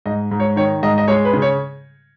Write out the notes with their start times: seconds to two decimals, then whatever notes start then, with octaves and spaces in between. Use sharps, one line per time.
0.06 G#2 D#5
0.31 G#2
0.40 C#5
0.56 D#3 C#5
0.83 G#2 D#5
0.98 D#5
1.08 G#3 C#5
1.25 B4
1.33 C#3
1.42 C#5